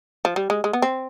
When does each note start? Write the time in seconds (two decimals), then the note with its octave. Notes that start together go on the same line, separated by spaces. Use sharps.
0.25 F3
0.36 G3
0.50 G#3
0.64 G#3
0.73 B3
0.82 C4